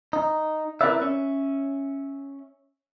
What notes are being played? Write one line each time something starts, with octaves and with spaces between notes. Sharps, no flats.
D#4
C4 E4 A#4 B4 D5 E5
C#4 E5